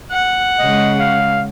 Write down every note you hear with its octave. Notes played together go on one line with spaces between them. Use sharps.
F#5
C#3 G#3 D#5
F5